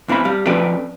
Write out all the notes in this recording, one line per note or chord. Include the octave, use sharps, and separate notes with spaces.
E2 E3 C4 F5 B5
G3 F5
F3 C4 C#4 A4 B4 D5